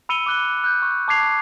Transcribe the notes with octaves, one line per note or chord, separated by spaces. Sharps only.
B5 E6 C#7 D#7 F7 G7
D6 F#6 G7
F#6 G6
C#6
A5 D6 G#6 C7 F7